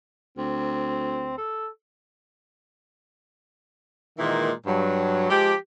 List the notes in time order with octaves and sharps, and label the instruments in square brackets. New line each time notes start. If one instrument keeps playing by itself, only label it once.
[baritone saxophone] D2 [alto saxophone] C4
[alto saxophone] A4
[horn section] A#2 D#3 E3 G#3 A#3
G2 F#3
F3 G#3 G4